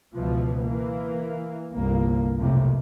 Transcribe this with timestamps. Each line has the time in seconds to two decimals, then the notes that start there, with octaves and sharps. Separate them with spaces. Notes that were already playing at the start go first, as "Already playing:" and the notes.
0.15 C#2 B2 E3 F3
0.63 E3 A#3
1.73 G1 C2 A#3
2.38 B1 F2 A2 C3 A#3